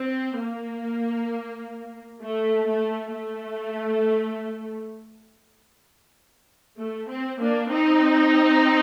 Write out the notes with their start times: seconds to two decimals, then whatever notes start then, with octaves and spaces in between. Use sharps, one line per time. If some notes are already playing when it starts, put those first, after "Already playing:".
Already playing: C4
0.38 A#3
2.22 A3
2.67 A3
3.13 A3
6.78 A3
7.09 C4
7.39 A#3 D4
7.70 C4 D#4